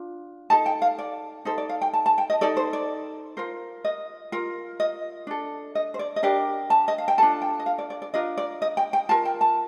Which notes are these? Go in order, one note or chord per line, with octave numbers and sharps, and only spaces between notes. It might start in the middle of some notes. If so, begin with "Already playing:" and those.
Already playing: D4 F4
D#4 A4 A5
G5
F5
D5
D#4 A4 C5
D5
F5
G5
A5
A5
G5
D#5
D#4 A4 D5
C5
D5
F4 A#4 C5
D#5
F4 A#4
D#5
D4 A4
D#5
C5
D5
D#5
D4 G4 A#4 D5
A5
D#5
F5
G5
D4 F4 A4 A5
G5
D#5
F5
D5
D5
D5
D4 F4 A#4 D#5
D5
D#5
G5
G5
F4 A#4 A5
G5
A5